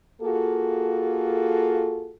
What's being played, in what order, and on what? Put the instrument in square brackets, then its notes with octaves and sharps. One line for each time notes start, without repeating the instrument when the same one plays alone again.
[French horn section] A#3 F4 F#4 G#4 A4